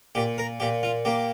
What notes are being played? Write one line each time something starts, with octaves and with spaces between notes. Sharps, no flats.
A#2 G4
A#4
A#2 G4
F4
A#3 G4